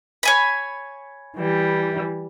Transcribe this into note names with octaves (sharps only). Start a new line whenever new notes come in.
C#5 G#5 B5
E3 G3